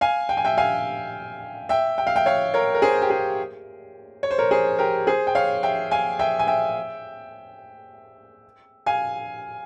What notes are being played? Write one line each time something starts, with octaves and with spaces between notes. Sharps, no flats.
F5 G#5
G5
G#5
E5 G5
F5 G#5
E5 G5
G5
F5
E5 G5
C#5 F5
A#4 C#5
A#4
G#4 C5
G4
G#4
C#5
C5
A#4 C#5
G#4 C5
G4 A#4
G#4 C5
G5
C#5 F5
E5 G5
F5 G#5
E5 G5
G#5
E5 G5
F5 G#5